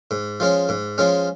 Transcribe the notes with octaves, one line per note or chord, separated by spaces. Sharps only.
G#2
F3 G#3 C#4
G#2
F3 G#3 C#4